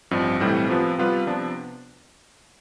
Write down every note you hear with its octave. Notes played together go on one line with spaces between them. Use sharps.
A1 G2 F3 C4
B1 A2 E3 G3 C4
C3 F3 B3 F4 B4
C3 G3 B3 F4 B4
C3 F3 B3 D4